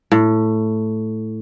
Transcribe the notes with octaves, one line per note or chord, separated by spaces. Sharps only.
A2